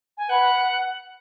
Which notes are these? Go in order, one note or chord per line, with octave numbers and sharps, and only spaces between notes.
G#5
B4 F#5